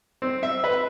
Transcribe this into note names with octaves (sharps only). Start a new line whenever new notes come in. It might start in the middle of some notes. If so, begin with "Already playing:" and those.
C4
E5
B4